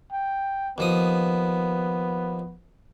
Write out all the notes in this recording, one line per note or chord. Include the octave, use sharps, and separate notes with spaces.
G5
D#2 F3 B3 D#6